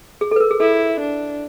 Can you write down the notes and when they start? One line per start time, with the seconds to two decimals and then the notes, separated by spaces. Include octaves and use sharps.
0.21 G#4
0.31 A4
0.36 B4
0.40 A#4
0.51 G#4
0.60 E4 A4
1.00 D4